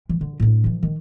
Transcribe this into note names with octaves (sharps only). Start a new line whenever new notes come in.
E3
D3
A2 D4
D#3 F3
D#3